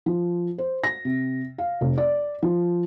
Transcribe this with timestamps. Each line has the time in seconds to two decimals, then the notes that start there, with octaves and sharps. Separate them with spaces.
0.06 F3
0.58 C5
0.84 A#6
1.05 C3
1.58 F5
1.81 F1
1.98 D5
2.42 F3